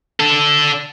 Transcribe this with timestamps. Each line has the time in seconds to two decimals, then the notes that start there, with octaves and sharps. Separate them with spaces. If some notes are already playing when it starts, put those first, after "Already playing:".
0.20 D4 A4